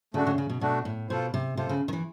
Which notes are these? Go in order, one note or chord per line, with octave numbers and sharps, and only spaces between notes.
C#3 A3 D4 F#4
C#3
C#3
B2
B2 A3 D4 F#4
A2
B2 F4 A4 C5
C3
C3 F4 A4 C5
C#3
D#3
E3